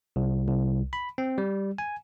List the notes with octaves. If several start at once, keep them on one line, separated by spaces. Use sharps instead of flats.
C2
C2
B5
C4
G3
G#5